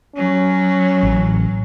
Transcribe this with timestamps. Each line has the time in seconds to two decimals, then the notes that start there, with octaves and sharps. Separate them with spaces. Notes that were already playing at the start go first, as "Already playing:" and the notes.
0.16 F#3 C#4
1.03 A1